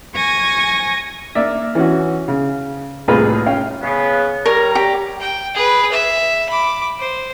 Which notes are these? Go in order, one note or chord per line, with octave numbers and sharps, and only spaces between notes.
G#5 C#6 G#6 A#6
A#3 D5 E5
E3 C#4 F#4
C#3
C2 A2 A#3 F4 G#4 B4
C#4 F5 G5
C#3 B3
G3 A#4 C#5 A#5
G4
G5
G#4 B4
E5
B5 D6
C5